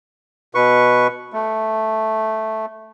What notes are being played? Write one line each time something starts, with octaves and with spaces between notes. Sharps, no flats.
B2 B4 C#6
A3